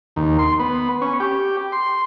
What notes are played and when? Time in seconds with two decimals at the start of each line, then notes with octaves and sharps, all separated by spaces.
0.16 D#2
0.39 C6
0.59 B3
1.02 C#4
1.20 G4
1.72 C6